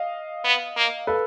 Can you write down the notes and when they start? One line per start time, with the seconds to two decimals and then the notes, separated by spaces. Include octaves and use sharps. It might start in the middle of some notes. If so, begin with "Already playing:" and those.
Already playing: D#5 F5
0.45 B3
0.76 A#3
1.07 A4 B4